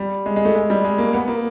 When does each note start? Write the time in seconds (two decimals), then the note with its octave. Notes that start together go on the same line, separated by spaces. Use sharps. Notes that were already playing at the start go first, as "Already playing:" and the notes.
Already playing: G3
0.26 G#3
0.36 G#3
0.45 A3
0.55 G#3
0.70 G3
0.84 G#3
0.98 A#3
1.13 B3
1.28 A#3